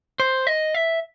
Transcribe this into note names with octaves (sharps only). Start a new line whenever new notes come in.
C5
D#5
E5